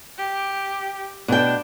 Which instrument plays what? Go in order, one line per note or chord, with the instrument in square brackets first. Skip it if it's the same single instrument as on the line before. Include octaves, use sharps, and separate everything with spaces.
[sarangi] G4
[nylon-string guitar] B2 G5 [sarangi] D4